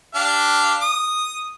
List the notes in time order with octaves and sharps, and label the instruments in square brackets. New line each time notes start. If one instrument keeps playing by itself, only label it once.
[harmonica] D4 G4 F5
D#6